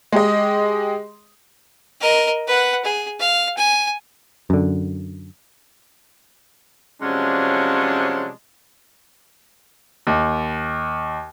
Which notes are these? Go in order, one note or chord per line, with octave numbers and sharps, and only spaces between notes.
G#3 G4 D#5
A#4 D#5
B4 F#5
G#4
F5
G#5
F#2 D3
C3 F3 F#3 G#3 C#4 D4
D#2